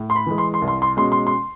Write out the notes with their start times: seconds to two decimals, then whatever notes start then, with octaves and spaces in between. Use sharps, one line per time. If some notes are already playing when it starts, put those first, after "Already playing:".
Already playing: A2
0.10 C6
0.16 B5
0.26 E3 G#3
0.38 C6
0.54 C6
0.62 C2
0.68 C6
0.82 C6
0.97 B2 G#3 C#4 C6
1.12 C6
1.27 C6